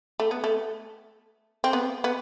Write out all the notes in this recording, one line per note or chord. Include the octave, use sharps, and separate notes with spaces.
A3
B3
A3
C4
B3
B3